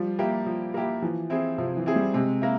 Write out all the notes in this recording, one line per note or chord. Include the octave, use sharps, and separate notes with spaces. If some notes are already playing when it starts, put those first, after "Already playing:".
Already playing: F3 G3
A#3 E4 G4
F3
A#3 E4 G4
E3 F3
C4 E4 G#4
C3 F3
E3
C4 E4 G#4
G3
C3 G#3
A#3 E4